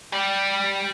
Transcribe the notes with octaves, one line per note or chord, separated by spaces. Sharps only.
G3 G4